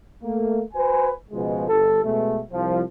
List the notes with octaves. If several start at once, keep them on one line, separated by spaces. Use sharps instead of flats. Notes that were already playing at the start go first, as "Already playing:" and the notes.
A3 A#3
F#4 B4 C5 G#5
C#2 B2 F3 G#3
G1 A4
B2 G#3 A3
C2 F3